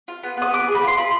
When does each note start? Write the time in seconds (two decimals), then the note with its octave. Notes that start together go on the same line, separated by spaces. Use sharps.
0.08 F4
0.23 B3
0.37 B3 D#6
0.53 B3 D6
0.68 G#4
0.75 B5
0.83 F4 C6
0.97 F4 B5